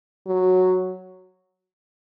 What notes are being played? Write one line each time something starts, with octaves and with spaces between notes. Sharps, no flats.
F#3